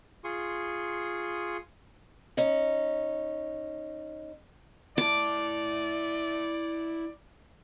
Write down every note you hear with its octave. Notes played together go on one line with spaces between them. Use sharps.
F4 G#4 C6 C#6 D#6
C#4 D#4
E4 D5 A5 D6